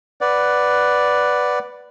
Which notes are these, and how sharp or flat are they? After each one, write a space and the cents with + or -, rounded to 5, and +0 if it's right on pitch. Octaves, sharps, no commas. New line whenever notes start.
B4 +0 D5 +0 F#5 +0